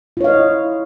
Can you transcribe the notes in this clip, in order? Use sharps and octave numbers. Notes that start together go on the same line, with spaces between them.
E4 F4 C#5 D#5 F5